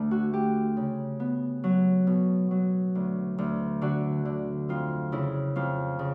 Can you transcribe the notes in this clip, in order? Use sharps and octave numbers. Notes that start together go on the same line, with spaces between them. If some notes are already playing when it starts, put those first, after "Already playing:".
Already playing: D2 A3
F#4
A3 G4
C#3
B3
F#3
B2
F#3
D2
D2
D3 F#4
D3
F2 F4
C#3 E4
F2 F4
C#3